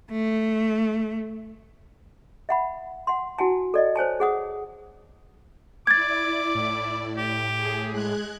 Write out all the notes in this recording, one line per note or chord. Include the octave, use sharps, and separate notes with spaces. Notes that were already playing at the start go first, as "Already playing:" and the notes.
A3
E5 F#5 B5
F#5 C6
E4 F#4 F#5 G#5 A5
A4 D5 D#5
C5 C#5 G#5 A5
G#4 F#5 D#6
E4 D5 D6 G#6 A6
A2
G4
G#4
G#3 F#6 G#6